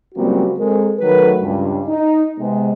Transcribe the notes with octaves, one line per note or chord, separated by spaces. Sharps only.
C#2 F#3 G3 A#3 C4 F#4
G#3 C4 A4 A#4
D#3 F#3 A3 A#4 B4
C#2 G2
D#4
C3 G#3 B3